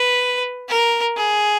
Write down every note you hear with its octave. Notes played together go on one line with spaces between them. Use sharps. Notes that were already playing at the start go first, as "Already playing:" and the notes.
Already playing: B4
A#4
G#4